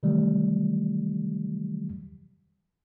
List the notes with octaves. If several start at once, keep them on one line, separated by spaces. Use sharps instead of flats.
C3 D#3 E3 F#3 G3 A3